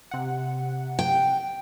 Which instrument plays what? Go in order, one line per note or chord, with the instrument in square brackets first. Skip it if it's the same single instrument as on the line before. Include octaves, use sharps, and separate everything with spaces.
[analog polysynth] C3 F#5
[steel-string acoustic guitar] G5